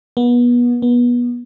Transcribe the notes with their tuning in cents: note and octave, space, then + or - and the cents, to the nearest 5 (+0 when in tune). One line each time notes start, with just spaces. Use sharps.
B3 -30
B3 -25